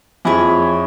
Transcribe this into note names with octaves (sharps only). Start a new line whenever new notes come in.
F2 E4 G#4 C#5